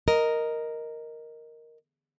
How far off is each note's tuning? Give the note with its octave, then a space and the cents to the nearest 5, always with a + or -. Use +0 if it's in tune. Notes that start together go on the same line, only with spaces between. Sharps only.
A#4 +0 D#5 +0